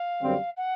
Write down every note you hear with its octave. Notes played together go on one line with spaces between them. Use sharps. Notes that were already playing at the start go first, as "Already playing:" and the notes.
Already playing: F5
F#2 D3 G3 C4
F#5